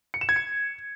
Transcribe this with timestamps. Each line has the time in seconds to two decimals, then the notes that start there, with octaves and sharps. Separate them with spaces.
0.14 C#7
0.21 E7
0.29 G#6
0.36 C#7